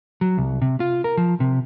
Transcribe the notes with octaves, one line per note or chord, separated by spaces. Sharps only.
F#3
C2
C3
F4
A#4
F3
C3